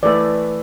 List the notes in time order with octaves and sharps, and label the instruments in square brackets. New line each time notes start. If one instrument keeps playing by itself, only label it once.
[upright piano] E3 A3 E4 [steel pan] D5